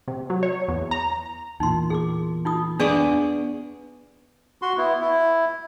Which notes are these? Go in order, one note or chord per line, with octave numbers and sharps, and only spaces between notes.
C3
F#3
C#5
E2
A#5
E2 A#2 D#4 C6
G#4 D6
D#4 F4 D#6
B3 D4 G#4 D5 G#5 C#6
F#4 C6
B3 E4
E4